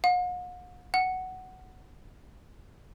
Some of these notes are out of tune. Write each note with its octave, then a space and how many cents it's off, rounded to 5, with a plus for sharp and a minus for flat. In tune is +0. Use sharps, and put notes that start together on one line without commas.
F#5 -45
F#5 +10